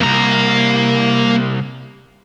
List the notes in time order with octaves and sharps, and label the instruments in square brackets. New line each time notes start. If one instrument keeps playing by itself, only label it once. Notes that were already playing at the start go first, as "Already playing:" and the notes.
[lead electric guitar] C2 F#2 [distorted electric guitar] A#3 A#5